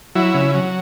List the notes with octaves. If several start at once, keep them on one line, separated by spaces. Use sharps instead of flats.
F#3 E4
C#3
F#3